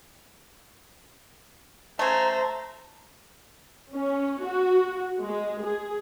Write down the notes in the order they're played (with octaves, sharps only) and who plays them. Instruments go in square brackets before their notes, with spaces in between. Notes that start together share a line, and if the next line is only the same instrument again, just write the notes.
[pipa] C#3 A3 [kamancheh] C5 A#5
[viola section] C#4
F#4
G#3
G#4